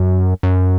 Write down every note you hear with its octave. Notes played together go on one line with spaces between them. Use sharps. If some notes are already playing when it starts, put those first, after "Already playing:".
Already playing: F#2
F#2